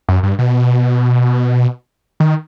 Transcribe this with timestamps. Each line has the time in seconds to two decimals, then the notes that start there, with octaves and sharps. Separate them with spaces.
0.09 F#2
0.23 G2
0.39 B2
2.20 D#3